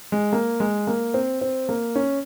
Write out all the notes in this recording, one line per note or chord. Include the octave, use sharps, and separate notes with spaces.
G#3
A#3
G#3
A#3
C4
C4
A#3
C#4